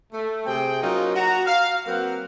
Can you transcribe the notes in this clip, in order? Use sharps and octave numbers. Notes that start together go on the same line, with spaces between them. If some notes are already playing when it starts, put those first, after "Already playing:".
A3
C3 C4 G#4 G5
F#3 A#3 C#4 D#4 F4
F#4 A#5
F5
F#3 A#3 C4 A#4 B4 F#5